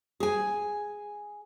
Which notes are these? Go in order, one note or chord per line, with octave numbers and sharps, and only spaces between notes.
G#4 G#5